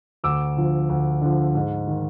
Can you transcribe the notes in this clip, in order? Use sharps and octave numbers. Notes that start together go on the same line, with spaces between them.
D2 D6 E6
D3 F3
D2
D3 F3
G#2
D#3